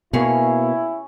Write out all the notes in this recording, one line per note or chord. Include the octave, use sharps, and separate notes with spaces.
B2 A#3 C#4 E4 G#4 C#5